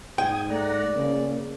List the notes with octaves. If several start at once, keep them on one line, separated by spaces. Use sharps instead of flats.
G#2 G5 D#6 G#6
A3 D5 F#5 A#5
C#3 A#3